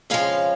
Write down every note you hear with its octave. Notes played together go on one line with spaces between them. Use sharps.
F2 C#3 F3 G#3 C#5 F5